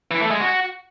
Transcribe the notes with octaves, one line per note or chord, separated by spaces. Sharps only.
E3
A3
G#3
F#4